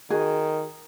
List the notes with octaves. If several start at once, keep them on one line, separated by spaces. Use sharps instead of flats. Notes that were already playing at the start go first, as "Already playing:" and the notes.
D#3 F#4 G#4 G#5